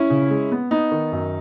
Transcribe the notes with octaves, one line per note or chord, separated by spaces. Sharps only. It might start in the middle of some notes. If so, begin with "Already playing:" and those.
Already playing: C#4 E4
C#3
G#3
B3
B3 D#4
D#3
F#2